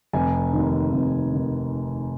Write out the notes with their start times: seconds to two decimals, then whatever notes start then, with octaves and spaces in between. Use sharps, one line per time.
0.13 F1 G#5
0.53 D#2 D#3
0.92 F1
1.34 D#3